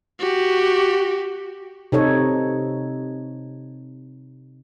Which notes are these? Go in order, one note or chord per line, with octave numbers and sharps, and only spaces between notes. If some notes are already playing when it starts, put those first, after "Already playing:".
F#4 G4
C3 D#4 A4 C#5